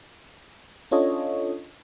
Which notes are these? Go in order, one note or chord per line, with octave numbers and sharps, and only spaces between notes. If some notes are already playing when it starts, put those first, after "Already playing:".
C#4 D4 F4 A4 C#5 D#5